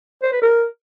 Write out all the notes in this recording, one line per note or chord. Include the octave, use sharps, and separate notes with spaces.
C5
B4
A#4